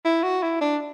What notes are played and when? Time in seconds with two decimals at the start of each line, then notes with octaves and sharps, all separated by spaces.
0.05 E4
0.23 F#4
0.43 E4
0.61 D4